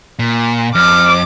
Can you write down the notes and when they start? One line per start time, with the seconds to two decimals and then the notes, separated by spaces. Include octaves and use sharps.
0.19 A#2
0.75 F2 D6 F6